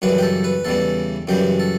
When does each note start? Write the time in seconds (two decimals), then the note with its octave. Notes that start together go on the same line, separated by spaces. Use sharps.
0.02 F#2 C#3 E3 G3 B4
0.18 G4
0.23 A4
0.44 B4
0.65 E2 C#3 E3 G3 A4
1.27 F#2 C#3 E3 G3 G4
1.60 A4